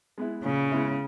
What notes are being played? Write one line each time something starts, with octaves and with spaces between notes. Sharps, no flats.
G#3 B3 E4
A#2 C#3
G#3 B3 E4